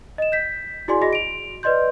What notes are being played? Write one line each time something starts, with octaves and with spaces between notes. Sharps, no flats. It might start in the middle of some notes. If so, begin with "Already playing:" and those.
D#5 E7
G6 B6
E4 F#4 G#4 D5 G#5 C6
F#4 G#4 D#5 B5 A#6
D7 F7
B4 D5 D#5 C6 G6